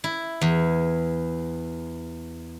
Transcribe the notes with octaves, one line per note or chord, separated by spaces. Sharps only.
E4
E2